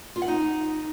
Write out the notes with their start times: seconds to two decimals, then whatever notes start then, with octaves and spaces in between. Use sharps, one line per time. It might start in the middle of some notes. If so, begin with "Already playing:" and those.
0.16 F4
0.22 F#5
0.28 D#4